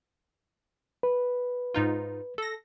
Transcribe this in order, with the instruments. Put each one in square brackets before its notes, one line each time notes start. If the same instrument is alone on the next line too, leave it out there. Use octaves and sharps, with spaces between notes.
[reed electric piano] B4
[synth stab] G#2 D#4 F4
A4 A#6